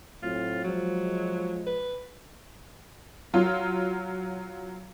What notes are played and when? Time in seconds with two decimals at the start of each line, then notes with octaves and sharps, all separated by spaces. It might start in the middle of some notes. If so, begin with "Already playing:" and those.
0.23 A2 F#3 C4 F4
0.64 F3 F#3 G#3
1.66 B4
3.34 F#3 F4